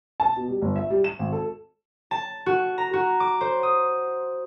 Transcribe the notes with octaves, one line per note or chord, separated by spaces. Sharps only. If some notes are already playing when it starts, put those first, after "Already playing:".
A5
B2
G3
G1
E5
G3
E7
G#1
A4
A5
F#4
A#5
F#4
D6
C5
D#6